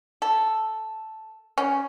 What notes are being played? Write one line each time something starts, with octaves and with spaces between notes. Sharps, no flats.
A4
C#4